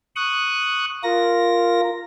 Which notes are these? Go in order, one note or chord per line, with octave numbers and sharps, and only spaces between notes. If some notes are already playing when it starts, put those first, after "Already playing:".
C#6 D#6 F#6
F4 A#4 A#6